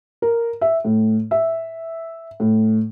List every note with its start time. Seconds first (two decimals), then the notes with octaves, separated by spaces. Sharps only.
0.22 A#4
0.61 E5
0.85 A2
1.31 E5
2.40 A2